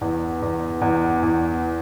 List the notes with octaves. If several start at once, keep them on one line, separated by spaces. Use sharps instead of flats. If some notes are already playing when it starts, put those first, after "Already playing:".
E2
E2
E2
E2